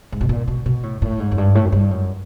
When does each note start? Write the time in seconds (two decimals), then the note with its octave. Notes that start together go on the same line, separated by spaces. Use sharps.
0.12 G#2
0.21 B2
0.29 A#2
0.48 B2
0.66 B2
0.83 A2
1.02 A2
1.20 G#2
1.31 F#2
1.38 G2
1.55 A2
1.65 F#2
1.72 G2
1.91 F#2